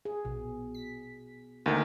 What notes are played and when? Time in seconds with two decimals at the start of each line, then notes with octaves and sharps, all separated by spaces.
0.05 G#4
0.25 A#1 B2
0.75 B6
1.66 D2 D#3 A#3